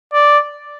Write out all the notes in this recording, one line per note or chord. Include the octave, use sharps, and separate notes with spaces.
D5